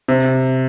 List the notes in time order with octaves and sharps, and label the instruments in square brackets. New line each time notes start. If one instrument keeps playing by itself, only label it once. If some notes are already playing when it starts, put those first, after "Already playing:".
[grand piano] C3